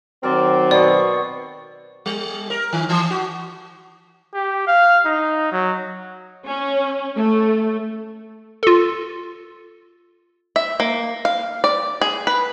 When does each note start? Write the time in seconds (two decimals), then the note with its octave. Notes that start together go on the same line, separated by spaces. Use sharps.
0.23 D#3 F#3 C4 A#4 D5
0.71 B2 B3 D5 C#6
2.06 G3
2.50 A#4
2.73 D#3
2.89 E3
3.10 F#4
4.34 G4
4.67 F5
5.05 D#4
5.52 F#3
6.46 C#4
7.16 A3
8.63 F4 A4
10.56 E5
10.80 A#3
11.25 F5
11.64 D5
12.01 G#4
12.27 B4